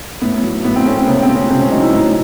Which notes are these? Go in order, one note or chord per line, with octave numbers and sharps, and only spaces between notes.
A2 B3
F#3
A2 B3
C4
A3 C#4
C4
C#2 B3
C4
B2
C#4
C#2 C4
C#4
F#3 D#4
E4
A2 D#4